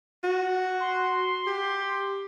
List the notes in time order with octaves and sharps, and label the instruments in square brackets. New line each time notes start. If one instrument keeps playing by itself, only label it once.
[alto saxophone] F#4
[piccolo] C6
[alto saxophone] G4